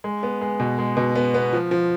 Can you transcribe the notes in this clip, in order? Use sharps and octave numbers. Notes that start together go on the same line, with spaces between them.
G#3
B3
G#3
B2
G#3
B2
B3
B3
F3
F3